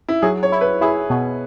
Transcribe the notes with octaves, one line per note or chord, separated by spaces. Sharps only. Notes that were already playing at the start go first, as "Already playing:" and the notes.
E4
F#3 G#4
C#5
E4
B4
E4 G#4
B2